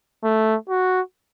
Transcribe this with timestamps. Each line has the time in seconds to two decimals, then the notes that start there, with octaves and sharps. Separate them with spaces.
0.24 A3
0.69 F#4